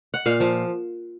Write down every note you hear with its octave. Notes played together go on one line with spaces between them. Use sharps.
F#5
A#2 F5
F3